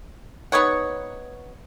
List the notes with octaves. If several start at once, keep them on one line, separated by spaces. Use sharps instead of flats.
B3 D#4 C#5 F#5